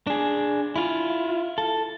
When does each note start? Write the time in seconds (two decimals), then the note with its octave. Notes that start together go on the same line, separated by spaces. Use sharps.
0.07 D4 G#4
0.76 E4 F4
1.58 A4